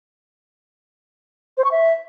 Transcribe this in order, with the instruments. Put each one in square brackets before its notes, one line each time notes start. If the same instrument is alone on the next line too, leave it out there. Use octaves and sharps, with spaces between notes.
[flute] C5
C#6
E5